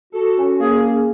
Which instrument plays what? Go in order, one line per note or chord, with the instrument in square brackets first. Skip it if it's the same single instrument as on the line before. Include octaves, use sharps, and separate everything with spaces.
[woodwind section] F#4 [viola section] A4
[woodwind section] C#4
[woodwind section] A#3 [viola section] G#4
[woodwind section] C#4